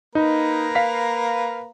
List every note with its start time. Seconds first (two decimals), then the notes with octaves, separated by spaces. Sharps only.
0.15 A#3 D#4 B4 A#5
0.75 F5 B6